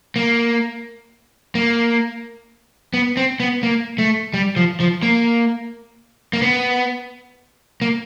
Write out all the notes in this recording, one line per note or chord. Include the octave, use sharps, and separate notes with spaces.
A#3
A#3
B3
C4
B3
A#3
A3
G3
F3
F3
A#3
A#3
B3
A#3